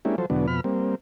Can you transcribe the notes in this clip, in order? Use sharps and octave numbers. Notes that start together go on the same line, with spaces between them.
G#3 A#3 C#4 D4 E4 G4
F3 F#3 A4 C5
E2 B2 D3 F#3 B3 D4
F2 B2 B5 F6
G3 A#3 C4